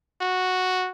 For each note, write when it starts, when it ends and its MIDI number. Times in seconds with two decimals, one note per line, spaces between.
0.21 0.91 66